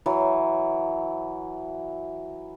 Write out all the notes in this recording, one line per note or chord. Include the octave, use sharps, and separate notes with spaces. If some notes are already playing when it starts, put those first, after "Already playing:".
E3 F#3